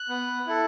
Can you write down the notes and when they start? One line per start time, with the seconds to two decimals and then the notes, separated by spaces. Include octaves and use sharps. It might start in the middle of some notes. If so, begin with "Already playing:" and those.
Already playing: F#6
0.09 B3
0.47 E4 A4